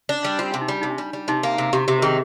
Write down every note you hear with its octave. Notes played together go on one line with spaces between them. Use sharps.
D4
G3
C4 F4
D4
C3
D#4
G3 D4
C3 D#4
D4
G3
G3
C3 D#4
A#3
C3
C3 G4
C3 G4
A#4
D#3 G#4